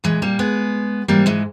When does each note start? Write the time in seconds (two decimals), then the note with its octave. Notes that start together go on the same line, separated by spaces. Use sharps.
0.04 A#2 E3 G#3
0.22 G3 A#3
0.39 G#3 B3
1.08 G#2 E3 G3 A#3
1.26 E3 G#3